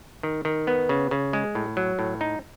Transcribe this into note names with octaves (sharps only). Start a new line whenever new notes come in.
D#3
D#3
B3
C#3
C#3
G#3
A2
F#3
A2
D#4